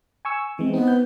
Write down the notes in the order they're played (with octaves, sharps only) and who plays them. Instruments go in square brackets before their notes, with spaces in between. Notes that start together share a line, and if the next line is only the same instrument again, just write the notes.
[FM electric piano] G#5 C#6 E6
[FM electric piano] E3 G#3 [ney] C4
[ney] B3 [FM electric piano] C4 D#4
[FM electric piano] G6